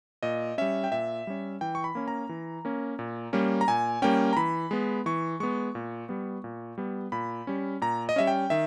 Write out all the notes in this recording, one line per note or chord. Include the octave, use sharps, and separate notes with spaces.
A#2 D#5
G3 C#4 E5
G5
A#2 E5
G3 C#4
E3 G5
C#6
B5
A#3 C#4
A#5
E3
A#3 C#4
A#2
G3 A#3 C#4
A#5
A#2 G#5
G3 A#3 C#4 G5
A#5
E3 B5
G#3 B3
E3 C#6
G#3 B3 C#6
A#2
G3 B3
A#2
G3 B3
A#2 B5
G3 C#4
A#2 A#5
D#5
G3 C#4 E5
G5
D#3 E5